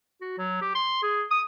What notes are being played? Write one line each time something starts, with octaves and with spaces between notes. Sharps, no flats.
F#4
F#3
G4
C6
G#4
D#6